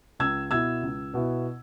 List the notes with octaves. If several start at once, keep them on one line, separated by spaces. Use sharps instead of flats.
C#2 E6 G#6
B2 B3 E4 E6 G#6
C#2
B2 B3 E4